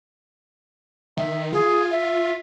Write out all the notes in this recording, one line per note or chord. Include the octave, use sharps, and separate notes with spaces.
D#3 E5
F4 G#4
E5